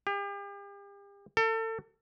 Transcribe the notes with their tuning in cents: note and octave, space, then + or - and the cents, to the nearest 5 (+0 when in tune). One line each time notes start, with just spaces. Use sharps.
G4 +40
A4 +35